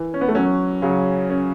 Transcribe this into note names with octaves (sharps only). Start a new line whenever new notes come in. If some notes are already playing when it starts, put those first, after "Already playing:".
Already playing: E3
C#4
B3
A3
F#3 C#4
C#3 F#3
C#4